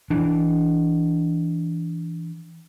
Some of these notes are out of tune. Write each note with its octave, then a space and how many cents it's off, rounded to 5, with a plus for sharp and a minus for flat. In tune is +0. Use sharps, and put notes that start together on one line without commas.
E3 +0 D4 -15